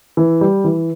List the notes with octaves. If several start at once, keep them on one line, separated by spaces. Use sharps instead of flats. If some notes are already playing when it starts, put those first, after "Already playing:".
E3
G3
E3